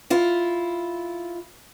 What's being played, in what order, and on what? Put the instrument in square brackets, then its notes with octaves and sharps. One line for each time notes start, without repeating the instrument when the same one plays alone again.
[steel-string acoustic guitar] E4 F4